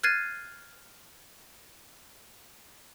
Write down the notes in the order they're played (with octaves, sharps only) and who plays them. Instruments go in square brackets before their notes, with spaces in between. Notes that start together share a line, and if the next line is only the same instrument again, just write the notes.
[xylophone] F6 F#6 G#6 A6 C7 D#7